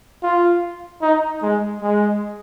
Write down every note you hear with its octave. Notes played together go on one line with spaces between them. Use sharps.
F4
D#4
G#3
G#3